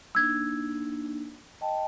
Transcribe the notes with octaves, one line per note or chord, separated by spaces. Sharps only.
A#3 D4 D#4 E6 G#6
D#5 G5 A5